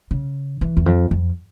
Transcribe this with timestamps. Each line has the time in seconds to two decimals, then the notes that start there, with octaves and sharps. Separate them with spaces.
0.11 C#3
0.61 E3
0.77 E2
0.86 F2
1.11 F2